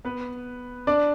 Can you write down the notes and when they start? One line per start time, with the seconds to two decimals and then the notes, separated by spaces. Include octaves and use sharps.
0.05 B3 B4
0.87 D4 D5